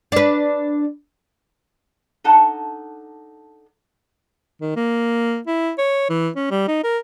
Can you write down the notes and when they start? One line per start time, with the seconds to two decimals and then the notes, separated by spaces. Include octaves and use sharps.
0.12 D4 B4
2.24 D4 D#4 A4 F#5 A5
4.61 D#3
4.76 A#3
5.47 E4
5.78 C#5
6.10 E3
6.36 C#4
6.51 G3
6.68 D#4
6.84 A#4